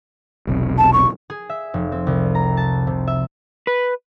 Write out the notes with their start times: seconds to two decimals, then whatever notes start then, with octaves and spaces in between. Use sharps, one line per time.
0.47 E1 B1 C3
0.78 A5
0.93 C#6
1.30 G#4
1.49 E5
1.74 F1
1.92 C4
2.07 C2
2.35 A#5
2.57 A5
2.87 C3
3.07 E5
3.67 B4